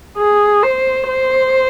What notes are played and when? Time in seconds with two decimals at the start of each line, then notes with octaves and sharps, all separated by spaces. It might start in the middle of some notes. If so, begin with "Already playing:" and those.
0.18 G#4
0.63 C5
1.08 C5